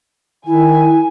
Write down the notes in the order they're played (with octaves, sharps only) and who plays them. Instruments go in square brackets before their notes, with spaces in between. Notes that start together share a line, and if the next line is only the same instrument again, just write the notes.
[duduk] D#3 [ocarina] E4 [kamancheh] G#5